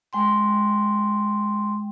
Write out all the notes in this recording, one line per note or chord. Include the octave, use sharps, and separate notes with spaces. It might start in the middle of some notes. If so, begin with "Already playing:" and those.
G#3 G5 C6